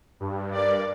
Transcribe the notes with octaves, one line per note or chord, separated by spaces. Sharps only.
G2
A#4 D5